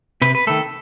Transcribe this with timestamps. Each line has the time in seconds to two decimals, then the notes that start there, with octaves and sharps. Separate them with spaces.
0.22 C3 B4
0.35 B4
0.47 D#3 A3 A4